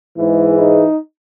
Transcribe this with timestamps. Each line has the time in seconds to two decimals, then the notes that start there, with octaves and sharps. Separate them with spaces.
0.17 G#2 E3 G#3 E4
0.59 D#4